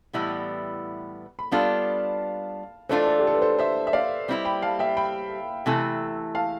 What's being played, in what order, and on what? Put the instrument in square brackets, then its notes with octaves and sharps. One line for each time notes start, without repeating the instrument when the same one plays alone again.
[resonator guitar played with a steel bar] A2 E3 G3 B3 E4
[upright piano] B5
[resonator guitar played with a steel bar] G3 B3 D4 F4 A4 [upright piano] F5 A5
[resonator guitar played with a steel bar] E3 A3 D4 F4 [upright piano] A4 C5
[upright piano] A4
G4
A4
B4
A4 C5
C5 E5
E5
D5 F5
[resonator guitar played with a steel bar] G3 C4 E4 G4
[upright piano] G5 B5
F5 A5
E5 G5
G5 B5
[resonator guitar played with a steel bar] C3 E3 A3 E4 A4
[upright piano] F5 A5